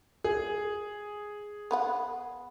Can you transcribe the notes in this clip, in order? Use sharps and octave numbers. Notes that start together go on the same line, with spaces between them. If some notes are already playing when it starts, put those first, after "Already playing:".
G#4
B3 B4 F#5